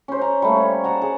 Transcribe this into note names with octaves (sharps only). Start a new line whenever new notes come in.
C#4 C5
A#5
G3 A3 A#3
C#5
F#5 A5 A#5
G#4